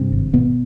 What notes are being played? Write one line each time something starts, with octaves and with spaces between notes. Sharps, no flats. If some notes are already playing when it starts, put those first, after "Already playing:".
Already playing: G2 C3 C4
G#1
G#1 B2 B3